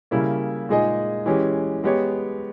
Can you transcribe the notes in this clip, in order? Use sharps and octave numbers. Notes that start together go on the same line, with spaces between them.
C#3 G3 A#3 E4
A#2 G#3 D#4 G#4 D#5
E3 G#3 C#4 G4
G#3 B3 G4 C#5